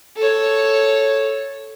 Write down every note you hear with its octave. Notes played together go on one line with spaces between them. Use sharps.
A4 C#5